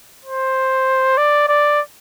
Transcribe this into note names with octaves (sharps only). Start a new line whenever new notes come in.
C5
D5
D5